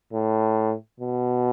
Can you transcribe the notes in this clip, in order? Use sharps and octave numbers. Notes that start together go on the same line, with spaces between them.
A2
B2